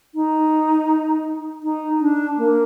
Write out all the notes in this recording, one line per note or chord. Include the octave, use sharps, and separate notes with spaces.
D#4
D#4
D4
A#3